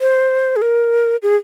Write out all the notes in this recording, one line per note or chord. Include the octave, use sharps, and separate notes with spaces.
C5
G#4
A#4
G#4